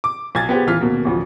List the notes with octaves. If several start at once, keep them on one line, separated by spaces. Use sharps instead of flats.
D6
B1 G#6 A6
B3 F4 G4 G#4 C5
D#1 E3 F4 F6 B6
D#1 B2 A#3
A1 D2 F3